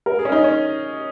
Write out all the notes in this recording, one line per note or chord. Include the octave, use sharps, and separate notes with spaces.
A#4
G#4
C#4
D#4
C#4